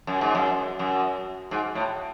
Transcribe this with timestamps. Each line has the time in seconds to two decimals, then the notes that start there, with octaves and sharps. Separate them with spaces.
0.07 F#2
0.21 G#2
0.35 F#2
0.79 F#2
1.51 G#2
1.75 A2